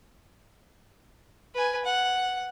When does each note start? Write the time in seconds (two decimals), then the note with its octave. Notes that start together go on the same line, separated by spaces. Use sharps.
1.54 B4 G#5
1.85 F#5